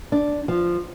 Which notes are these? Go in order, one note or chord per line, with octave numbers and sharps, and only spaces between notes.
D4
F3